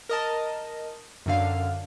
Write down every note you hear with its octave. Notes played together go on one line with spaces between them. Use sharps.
A#4 D#5 A5
F#2 D3 F5